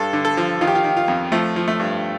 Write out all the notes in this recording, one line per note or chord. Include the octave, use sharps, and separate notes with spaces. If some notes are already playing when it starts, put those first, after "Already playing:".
Already playing: G2 A4
D3
A4
F3
D#3 F4
G4
F4
D#3
F4
F2
F3 A3
F3
A3
G2